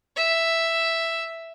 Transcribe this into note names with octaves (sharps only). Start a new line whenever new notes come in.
E5